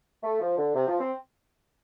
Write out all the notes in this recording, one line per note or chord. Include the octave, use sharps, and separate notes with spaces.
A3
F3
D3
C3
F3
C4